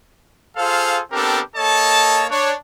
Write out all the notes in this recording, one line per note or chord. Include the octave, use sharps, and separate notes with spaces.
F4 G#4 A4 C5 F5
B3 C4 D4 G4 A4 A#4
A#3 A4 C#5 D#5 A5
D4 C#5